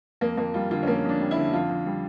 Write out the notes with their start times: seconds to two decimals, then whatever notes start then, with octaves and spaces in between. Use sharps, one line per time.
0.21 F2 A#3
0.37 F2 A#3
0.54 G3 F4
0.71 D3 F4
0.83 C#4
0.87 F2 A#3
1.04 F2
1.09 D4
1.20 G3
1.31 E4
1.36 D3
1.53 F2 F4
1.69 F2
1.86 G3